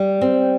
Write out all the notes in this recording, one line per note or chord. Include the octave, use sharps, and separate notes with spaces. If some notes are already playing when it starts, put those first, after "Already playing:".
Already playing: G3
C4